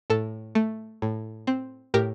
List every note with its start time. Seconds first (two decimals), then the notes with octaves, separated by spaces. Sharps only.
0.10 A2 A4
0.55 A3
1.02 A2
1.47 C4
1.94 A2 G4 A#4